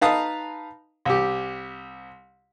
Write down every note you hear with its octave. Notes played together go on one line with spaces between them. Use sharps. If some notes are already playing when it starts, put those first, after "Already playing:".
D#4 B4 F5 A5 A#5 D#6
C2 G4